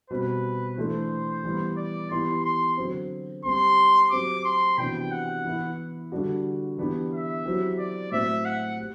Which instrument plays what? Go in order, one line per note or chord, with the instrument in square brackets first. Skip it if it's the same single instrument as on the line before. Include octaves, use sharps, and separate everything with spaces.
[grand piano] B2 G3 C4 [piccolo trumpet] B4
[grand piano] E3 A3 D4 [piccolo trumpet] C5
[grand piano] E3 G3 B3
[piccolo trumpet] D5
[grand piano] E3 B3 E4 G4 [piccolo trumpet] C6
[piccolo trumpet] C6
[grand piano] D3 F#3 C4
[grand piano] G3 C4 G4 [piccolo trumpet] C6
[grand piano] F#3 C4 G4 [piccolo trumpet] D6
[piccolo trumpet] C6
[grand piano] C3 E3 B3 D4 F#4 [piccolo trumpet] G5
[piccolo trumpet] F#5
[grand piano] E3 B3 E4
D3 G3 D4 F#4
E3 B3 D4 G4
[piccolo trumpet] E5
[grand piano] F#3 C4 E4 G4
[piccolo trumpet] D5
[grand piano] A2 F#3 C4 [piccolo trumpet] E5
[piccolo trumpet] F#5
[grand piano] G4